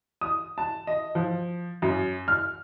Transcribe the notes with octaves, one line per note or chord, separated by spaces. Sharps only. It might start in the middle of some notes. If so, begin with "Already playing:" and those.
D#6
A5
D#5
F3
F#2
F6